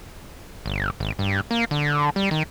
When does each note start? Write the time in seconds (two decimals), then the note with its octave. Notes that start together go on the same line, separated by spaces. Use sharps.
0.66 G1
1.00 G#1
1.19 G2
1.51 A#3
1.71 D3
2.16 G3
2.31 D#3